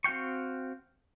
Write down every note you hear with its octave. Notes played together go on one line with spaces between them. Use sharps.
C4 F#4 F5 G5 C#6